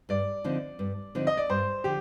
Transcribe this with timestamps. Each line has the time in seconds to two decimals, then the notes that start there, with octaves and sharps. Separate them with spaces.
0.09 G2 D5
0.44 D3 F3 C4 D#4
0.79 G2
1.15 D3 F3 C4 D#4
1.27 D#5
1.37 D5
1.49 G2 C5
1.84 D3 F3 G4